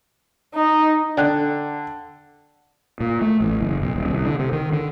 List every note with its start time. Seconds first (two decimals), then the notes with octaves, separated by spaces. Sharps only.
0.55 D#4
1.17 D3 D5 G5 F#6
3.00 A#2
3.21 A3
3.40 A1
3.60 F#1
3.82 B1
3.96 D#1
4.10 C2
4.25 D3
4.39 C3
4.53 D#3
4.73 D3